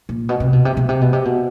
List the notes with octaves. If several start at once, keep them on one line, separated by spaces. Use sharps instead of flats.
A#2
B2
C3
B2
C3
B2
C3
B2
C3
B2